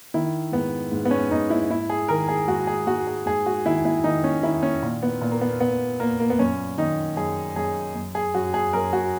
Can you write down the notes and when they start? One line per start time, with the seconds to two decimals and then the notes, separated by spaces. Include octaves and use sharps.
0.14 D#3 E4
0.52 G#2 B3
0.92 G#2
1.05 B3
1.11 C#4
1.31 G#2 D#4
1.50 E4
1.70 G#2 E4
1.90 G#4
2.08 D#3 A#4
2.28 G#4
2.48 G#2 F#4
2.67 G#4
2.87 G#2 F#4
3.07 G#4
3.26 G#2 G#4
3.46 F#4
3.66 D#3 E4
3.85 E4
4.04 D#3 D#4
4.24 C#4
4.43 D#3 E4
4.63 C#4
4.83 A#2
5.03 B3
5.22 A#2
5.31 A#3
5.41 B3
5.60 A#2 B3
6.00 A#2 A#3
6.19 A#3
6.30 B3
6.39 F#2 C#4
6.77 D#3 D#4
7.16 F#2 G#4
7.56 F#2 G#4
7.95 F#2
8.15 G#4
8.34 F#2 F#4
8.54 G#4
8.73 F#2 A#4
8.93 F#4